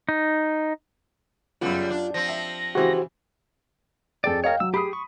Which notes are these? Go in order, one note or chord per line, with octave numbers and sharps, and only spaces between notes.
D#4
F#2 C#3 G3 B3 F4
D4
F3 C4 A#6
E5
C#3 E3 F#4 G4 C5
F2 G#4 A4 D5 G5
A#4 C#5 D#5 F5 G5
F#3 E6
G4 G#4 B5 D#6
C#6